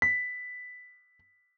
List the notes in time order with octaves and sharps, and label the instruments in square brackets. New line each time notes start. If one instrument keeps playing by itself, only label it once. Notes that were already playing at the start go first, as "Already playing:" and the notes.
[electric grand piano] B6